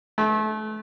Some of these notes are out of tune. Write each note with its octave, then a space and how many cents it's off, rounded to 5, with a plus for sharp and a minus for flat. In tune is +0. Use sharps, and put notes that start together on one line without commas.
A3 -30